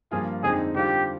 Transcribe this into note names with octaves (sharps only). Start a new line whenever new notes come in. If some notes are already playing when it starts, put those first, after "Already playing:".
G2 F3 A#3 F4 G#4
F2 D3 G#3 C4 D#4 G#4
D3 G3 C4 F4 G4